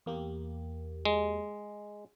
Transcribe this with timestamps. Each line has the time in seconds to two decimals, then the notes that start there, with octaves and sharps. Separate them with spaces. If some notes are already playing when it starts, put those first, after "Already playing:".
0.06 E2 A#3 G4
1.05 G#3